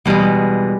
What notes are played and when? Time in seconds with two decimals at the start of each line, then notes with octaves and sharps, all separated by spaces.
0.06 E2 B2 G3 G#3
0.20 G3